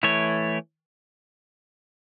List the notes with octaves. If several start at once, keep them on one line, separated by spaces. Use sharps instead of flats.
E3 A3 E4 C#5